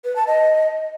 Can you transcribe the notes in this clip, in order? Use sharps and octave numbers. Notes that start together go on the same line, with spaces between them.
B4
A5
D#5